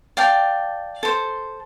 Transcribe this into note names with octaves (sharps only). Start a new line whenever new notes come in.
D5 F5 G5 A5
A4 C5